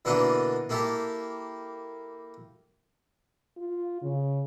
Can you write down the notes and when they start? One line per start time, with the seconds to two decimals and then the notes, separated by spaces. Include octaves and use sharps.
0.05 B2 D3 E3 A#3 D4 A4
0.69 A#3 E4 G4 A4
3.57 F4
4.02 C#3